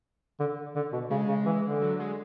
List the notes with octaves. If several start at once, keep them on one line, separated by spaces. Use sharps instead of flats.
D3
D3
B2
C#3 G#3
C#3
E3
D3
F#3
G#3